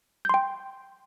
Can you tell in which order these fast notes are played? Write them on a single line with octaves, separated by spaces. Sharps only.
G6 C6 G5